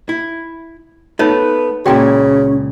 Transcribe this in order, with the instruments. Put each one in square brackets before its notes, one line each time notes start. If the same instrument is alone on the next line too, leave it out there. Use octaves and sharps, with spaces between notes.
[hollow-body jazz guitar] E4
[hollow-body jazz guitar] A3 B3 [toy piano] D#4 F4 C#5 [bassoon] B4
[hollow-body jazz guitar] C#2 A#2 E4 [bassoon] C#3 [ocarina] C#4 [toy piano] F#4 G5